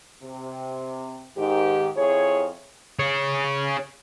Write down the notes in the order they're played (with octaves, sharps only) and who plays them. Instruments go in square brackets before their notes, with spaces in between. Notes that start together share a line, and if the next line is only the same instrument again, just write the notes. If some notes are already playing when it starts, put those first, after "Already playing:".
[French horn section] C3
G#2 D#3 G4
F2 E4 G#4 C#5
[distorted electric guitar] G#4 C#5